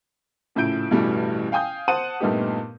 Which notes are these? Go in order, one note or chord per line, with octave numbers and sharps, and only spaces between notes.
A#1 A2 C#3 E4 G6 D7
A1 G2 B2 E3 G3 A3
F5 G5 G#5 D#6 G6
C5 F#5 A5 D#6 D#7
G2 A#2 A3 B3 D#4 G4